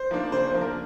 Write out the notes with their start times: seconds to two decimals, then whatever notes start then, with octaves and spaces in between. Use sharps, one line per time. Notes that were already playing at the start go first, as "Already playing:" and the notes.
Already playing: C5
0.11 F3 A#3 D4
0.32 C#3 C5
0.47 C5
0.54 F3 A#3 D4
0.61 A#4